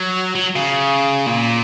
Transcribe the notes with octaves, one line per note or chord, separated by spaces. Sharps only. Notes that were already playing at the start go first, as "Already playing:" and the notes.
Already playing: F#3
F#3
C#3
A#2